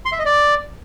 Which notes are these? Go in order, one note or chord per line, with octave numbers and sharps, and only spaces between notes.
C6
E5
D#5
D5